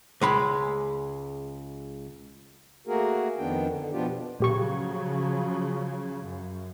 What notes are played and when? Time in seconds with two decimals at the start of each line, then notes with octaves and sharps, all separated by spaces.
0.21 C#2 G#3 B5
2.87 A3 A#3 F#4 G#4 A#4
3.38 F2 D#3 B3 D4 G5
3.68 D3
3.92 B2 F3 B3 D4 F4 G4
4.40 A#2 C#3 F3 F#3 G4 C#6
6.24 F#2